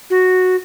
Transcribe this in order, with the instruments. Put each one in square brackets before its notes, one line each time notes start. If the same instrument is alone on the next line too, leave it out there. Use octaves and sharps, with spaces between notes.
[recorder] F#4